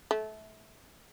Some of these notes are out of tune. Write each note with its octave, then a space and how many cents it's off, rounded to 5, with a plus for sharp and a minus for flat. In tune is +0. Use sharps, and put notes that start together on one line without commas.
A3 -25